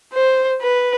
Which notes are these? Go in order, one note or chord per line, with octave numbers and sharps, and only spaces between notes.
C5
B4